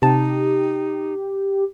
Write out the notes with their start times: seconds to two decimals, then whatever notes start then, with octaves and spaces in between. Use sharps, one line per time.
0.02 C3 D#4 G4 A5